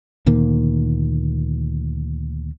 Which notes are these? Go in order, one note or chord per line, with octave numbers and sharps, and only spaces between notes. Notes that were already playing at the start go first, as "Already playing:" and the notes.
D2 A#2 D#3 A#3